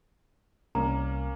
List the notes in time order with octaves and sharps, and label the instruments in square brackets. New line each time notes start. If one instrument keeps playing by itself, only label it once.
[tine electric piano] C2 [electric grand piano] A#3 C#4 [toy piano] A#5